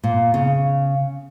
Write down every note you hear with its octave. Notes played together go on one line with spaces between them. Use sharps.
A#2
C#3